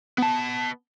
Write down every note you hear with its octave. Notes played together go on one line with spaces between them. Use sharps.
B3 A5